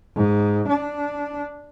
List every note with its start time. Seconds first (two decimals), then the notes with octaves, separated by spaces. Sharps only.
0.15 G#2
0.69 D4